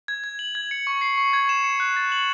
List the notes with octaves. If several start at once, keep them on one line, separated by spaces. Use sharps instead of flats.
G#6
G#6
F#7
G#6
C#7
C#6
C7
C#6
G#6
E7
C#7
F#6
A6
F#7